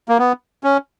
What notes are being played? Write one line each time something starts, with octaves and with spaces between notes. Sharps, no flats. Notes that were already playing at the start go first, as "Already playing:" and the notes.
A#3
B3
C#4